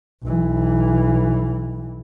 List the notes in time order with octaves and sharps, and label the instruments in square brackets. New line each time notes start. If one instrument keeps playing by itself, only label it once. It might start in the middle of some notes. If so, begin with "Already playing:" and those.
[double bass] B1 E3